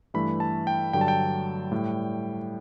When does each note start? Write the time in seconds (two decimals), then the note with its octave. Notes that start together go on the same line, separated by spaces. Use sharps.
0.14 G2 E3 A3 B5
0.40 A5
0.67 G5
0.93 G2 D3 F#3 G5
1.01 A5
1.08 G5
1.71 A2 G3